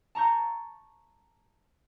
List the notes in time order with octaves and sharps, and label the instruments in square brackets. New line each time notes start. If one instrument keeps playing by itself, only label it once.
[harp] A5 A#5 C#6 G6